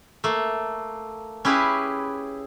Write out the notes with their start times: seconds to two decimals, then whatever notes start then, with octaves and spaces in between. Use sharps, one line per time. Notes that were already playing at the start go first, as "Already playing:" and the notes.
0.24 A3 A#3
1.45 C#4 E4 G4 G#4 B4